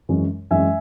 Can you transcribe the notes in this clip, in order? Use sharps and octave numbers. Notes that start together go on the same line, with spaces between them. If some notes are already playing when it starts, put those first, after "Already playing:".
F#2 E3 G#3 C#4
F#2 E3 G#3 C#4 E5 G#5